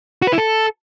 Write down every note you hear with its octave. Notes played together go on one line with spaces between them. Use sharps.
F#4
B4
E4
A4